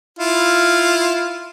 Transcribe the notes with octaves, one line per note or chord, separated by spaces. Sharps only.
E4 F4